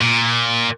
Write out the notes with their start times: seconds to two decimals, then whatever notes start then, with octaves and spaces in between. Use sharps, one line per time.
0.01 A#2